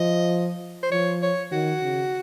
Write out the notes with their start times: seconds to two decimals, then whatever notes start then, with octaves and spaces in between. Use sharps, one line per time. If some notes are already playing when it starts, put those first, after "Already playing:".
Already playing: F3 D#5
0.83 C5
0.92 F3 C#5
1.22 C#5
1.51 D#3 F#4
1.82 C#3